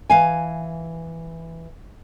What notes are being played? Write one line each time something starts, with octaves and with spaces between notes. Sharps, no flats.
E3 F5 G#5